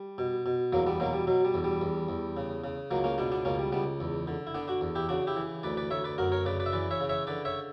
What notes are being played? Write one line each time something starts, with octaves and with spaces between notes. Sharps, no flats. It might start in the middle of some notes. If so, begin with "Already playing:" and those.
Already playing: G3
B2
B2
E2 F#3 A#3
G3 B3
B2 F#3 A#3
G3
B2 F#3
G3
E2
G3
E2
E2
C#3
C#3
C#2 F#3 A#3
A#3 C#4
B2 B3 D4
B3 D4
C#2 A#3 C#4
G3
C#2 G3 B3
E2
D3
E4
D3 B3 D4
D4 F#4
E2
E4 G4
C#3 D4 F#4
E4 G4
E3
D2 B4 D5
B4 D5
D2 C#5 E5
B4 D5
F#2 F#4 A#4
A#4 C#5
C#3 B4 D5
B4 D5
E5
E3 B4 D5
C#5 E5
C#3
C#5 E5
D3 B4 D5
C#5 E5